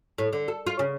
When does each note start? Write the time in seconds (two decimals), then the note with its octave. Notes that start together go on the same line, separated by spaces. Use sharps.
0.18 A2
0.33 D3
0.48 A4
0.67 F4
0.79 C#3